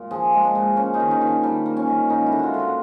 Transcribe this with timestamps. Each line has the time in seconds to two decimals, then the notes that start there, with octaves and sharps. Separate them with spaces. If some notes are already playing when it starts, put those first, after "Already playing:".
Already playing: A#2
0.11 F3 G#4
0.33 G#3
0.44 D4
0.55 A#2
0.77 A#3 C#4
0.94 D#4
1.00 D#3
1.11 D#4
1.21 D#3
1.27 D4
1.43 G3 D4
1.66 A#3
1.77 C#4
1.88 D#3
2.10 A#3 D#4
2.26 E4
2.32 D3
2.39 F4 F#4
2.54 D3
2.59 F#4